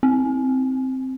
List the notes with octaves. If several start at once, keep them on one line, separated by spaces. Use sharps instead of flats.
C4